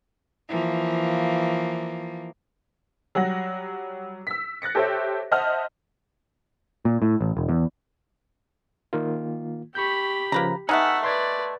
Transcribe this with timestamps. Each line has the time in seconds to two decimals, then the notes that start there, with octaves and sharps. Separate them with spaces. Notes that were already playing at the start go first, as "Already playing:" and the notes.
0.49 E3 F3 A#3
3.15 F#3 G3 F#5 A#6
4.27 E6 B6
4.62 F#6 A6 A#6 C#7
4.75 G4 A4 C5 C#5 E5
5.31 C5 D#5 E5 F#5 A5 F6
6.85 A#2
7.02 A2
7.21 A1
7.37 E1
7.49 E2
8.93 D#3 A#3 F4
9.75 G4 B5 C#6 G6
10.32 C#3 F3 A#3 B4 A#5
10.69 A3 B3 D#4 E5 F#5 G#5 F6
11.04 B4 D5 C6 G#6